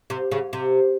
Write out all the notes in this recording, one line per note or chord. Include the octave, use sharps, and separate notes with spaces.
C3
C#3
C3